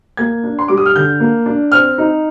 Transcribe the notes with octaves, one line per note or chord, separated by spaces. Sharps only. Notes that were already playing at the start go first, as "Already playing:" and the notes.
A#3 G#6
D4
C6
G3 D6
D#6
F6
D3 G6
A#3
D4
C4 F6
D#4